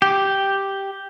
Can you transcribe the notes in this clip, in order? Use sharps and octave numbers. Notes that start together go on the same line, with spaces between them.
G4